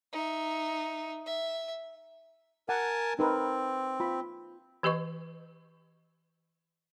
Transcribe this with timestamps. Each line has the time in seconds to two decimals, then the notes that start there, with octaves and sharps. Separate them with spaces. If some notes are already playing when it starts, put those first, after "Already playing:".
0.13 D#4 E5
1.26 E5
2.69 A#4 F#5 G#5 A5
3.19 C4 D#4 A#4 B4
4.00 F4 B5
4.83 E3 G4 B4 D#5 C#6